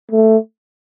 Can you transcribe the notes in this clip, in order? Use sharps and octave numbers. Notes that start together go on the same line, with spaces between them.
A3